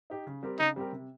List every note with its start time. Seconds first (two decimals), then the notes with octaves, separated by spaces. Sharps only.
0.10 D#4 G4
0.27 C#3
0.43 G3 C4 G4 A#4
0.59 C#3 D#4
0.76 G3 C4 G4 A#4
0.92 C3